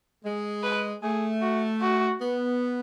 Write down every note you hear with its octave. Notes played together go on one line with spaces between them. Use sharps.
G#3
B4
A3 G#4
F#4
F#4
B3